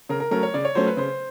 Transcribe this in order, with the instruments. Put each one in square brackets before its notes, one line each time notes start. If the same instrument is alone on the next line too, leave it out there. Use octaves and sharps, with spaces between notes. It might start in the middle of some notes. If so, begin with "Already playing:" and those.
[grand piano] C#3 A#4
A#4
F#3 A3 C#4 A#4
C#5
C#3 D5
C#5
F#3 A3 C#4 C5
B4
C#3 C5